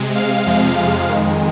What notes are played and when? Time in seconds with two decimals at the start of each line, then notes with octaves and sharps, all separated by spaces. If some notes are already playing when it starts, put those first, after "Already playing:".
Already playing: C3 G#3
0.15 F5
0.46 F2 C3 F3 G#3
1.08 F2 D#3 G#3